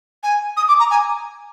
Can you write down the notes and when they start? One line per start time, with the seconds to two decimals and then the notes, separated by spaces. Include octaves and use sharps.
0.23 G#5
0.56 D#6
0.68 D6
0.79 A#5
0.90 G#5